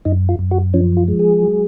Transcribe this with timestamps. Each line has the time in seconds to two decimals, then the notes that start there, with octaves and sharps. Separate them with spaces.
0.05 F#2 D#4
0.29 F4
0.39 F#2
0.51 F#4
0.74 F3 C#4
0.97 F4
1.08 G#3
1.19 G#4
1.42 F#3